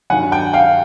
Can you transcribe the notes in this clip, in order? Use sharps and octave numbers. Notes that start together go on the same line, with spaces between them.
G2 D#3 F#3 F#5 G#5
G5 A5
F5 G5